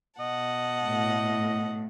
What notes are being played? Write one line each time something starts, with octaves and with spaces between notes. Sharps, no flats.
B2 D#5 F#5 A5
A2